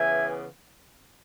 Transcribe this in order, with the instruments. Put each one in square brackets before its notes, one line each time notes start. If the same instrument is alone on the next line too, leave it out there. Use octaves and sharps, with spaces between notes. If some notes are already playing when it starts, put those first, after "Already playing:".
Already playing: [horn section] C#3 E3 B3 E5 G#5